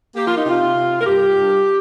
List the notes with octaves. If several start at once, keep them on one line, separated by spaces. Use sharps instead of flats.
A#3 G4
F4
D#4
C3 F4
C3
A#4
G2 G4
G2